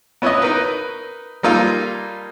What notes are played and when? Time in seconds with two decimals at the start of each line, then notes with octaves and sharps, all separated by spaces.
0.22 B3 C#4 E4 B4 C#5 D#5
0.42 D#4 A#4 B4
1.43 G3 A#3 D#4 F4 A4